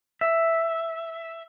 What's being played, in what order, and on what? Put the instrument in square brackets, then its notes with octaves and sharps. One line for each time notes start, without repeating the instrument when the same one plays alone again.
[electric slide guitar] E5